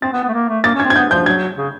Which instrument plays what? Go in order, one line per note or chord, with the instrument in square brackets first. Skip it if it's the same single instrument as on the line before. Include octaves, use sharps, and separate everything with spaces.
[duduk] C4 [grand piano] A6
[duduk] B3
B3
A3
A#3
A3
[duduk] A#3 [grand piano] A6
[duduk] C#4
[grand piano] G#6
[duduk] C4
[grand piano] G#6
[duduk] B3 [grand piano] G6
[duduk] F3 [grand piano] G6
[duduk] F#3 [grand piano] G#6
[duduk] C#3